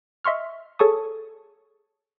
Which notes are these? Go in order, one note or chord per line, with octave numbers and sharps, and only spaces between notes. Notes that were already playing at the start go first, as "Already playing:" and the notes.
D#5 E5 C6 C#6 F6
G#4 A4 C#5 A5 C#6 D#6